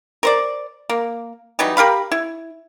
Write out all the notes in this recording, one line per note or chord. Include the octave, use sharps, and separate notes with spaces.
A#4 C5 D5
A#3
E3 F#3 G3 D#4
G4 A#4 F5 B5
E4